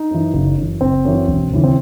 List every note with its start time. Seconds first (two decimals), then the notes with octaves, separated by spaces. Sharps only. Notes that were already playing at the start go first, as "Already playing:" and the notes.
Already playing: D#4
0.11 F#2 E3
0.34 F#1
0.57 F#2 E3
0.81 F#1 C4
1.05 F#2 E3
1.28 E1
1.52 D#2 C#3 E3
1.64 C4